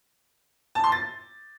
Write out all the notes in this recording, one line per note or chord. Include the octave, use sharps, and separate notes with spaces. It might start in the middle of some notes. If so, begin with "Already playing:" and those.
A5
C6
A6